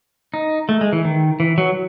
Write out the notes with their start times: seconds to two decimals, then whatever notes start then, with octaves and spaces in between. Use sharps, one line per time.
0.34 D#4
0.69 A3
0.81 G#3
0.93 E3
1.05 D#3
1.40 E3
1.58 F#3